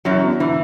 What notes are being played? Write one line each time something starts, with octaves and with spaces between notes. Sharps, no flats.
F#2 E3 F#3
B3 D4
D3 E3